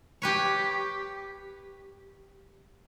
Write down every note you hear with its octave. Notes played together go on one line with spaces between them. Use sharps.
G4 B4 C#5